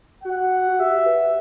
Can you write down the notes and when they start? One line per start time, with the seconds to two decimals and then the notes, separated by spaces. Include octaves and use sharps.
0.24 F#4 F#5
0.68 F#4
0.79 G4 E5
1.06 B4